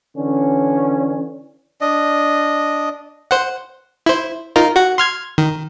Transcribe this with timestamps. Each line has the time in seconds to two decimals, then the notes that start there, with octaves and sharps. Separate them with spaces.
0.17 D3 E3 C#4
1.81 D4 D#5
3.31 C5 F#5
4.06 E4 C5
4.56 D#4 F4 A#4
4.76 F#4 F#5
4.98 C6 F6 G#6
5.38 D#3